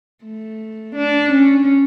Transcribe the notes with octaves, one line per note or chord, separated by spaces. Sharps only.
A3
D4
C#4